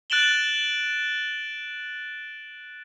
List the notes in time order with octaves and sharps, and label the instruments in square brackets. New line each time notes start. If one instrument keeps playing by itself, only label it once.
[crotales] F#6 A6 D7 E7 F#7 G7